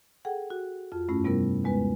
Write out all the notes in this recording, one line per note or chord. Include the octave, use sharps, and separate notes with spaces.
G#4 A4 F#5 G5
F#4
F2 F4
G2 A3 C#4 E4
C3 G3 B3 E4 A#4
D#2 G#3 B3 B4